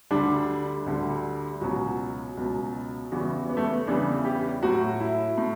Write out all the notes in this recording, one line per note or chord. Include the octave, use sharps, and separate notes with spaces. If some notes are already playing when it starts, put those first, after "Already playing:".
D2 D3 G3 D4
D2 D3 G3
C#2 B2 F#3 F#4
C#2 B2 F#3
E2 C#3 E3 G3 F#4
B3
A3
B3
E2 C#3 E3 G3 D4
G4
A2 F#3 F#4
E4
A2